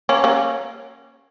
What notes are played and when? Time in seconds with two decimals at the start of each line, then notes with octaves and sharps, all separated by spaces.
0.09 A#3 C#4
0.24 A#3 C#4